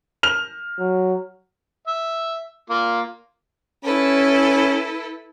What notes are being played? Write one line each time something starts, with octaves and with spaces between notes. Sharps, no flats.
F6 F7
F#3
E5
A#3 F4
C#4 E4 A4 B4